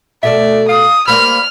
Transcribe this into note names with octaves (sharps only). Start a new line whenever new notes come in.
B2 A3 A4 D5 E5
F5 D#6
G3 A#3 C5 B5 F6